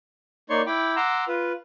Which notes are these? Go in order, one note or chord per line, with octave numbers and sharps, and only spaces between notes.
A#3 D#4 C#5 D5 C6 C#6
E4 G5 B5 D6
F#5 A#5 C6 D6 E6
F4 B4